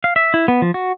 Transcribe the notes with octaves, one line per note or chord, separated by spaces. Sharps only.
F5
E5
E4
B3
F3
F#4